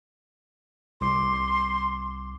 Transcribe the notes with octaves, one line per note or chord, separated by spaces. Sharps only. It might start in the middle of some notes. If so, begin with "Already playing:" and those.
C2 C6 D6